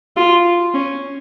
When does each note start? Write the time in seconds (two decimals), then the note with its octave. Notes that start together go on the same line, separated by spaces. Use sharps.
0.17 F4
0.74 C#4